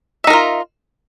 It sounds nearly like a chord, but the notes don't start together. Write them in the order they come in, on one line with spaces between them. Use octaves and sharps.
E5 D#4 A#4 F4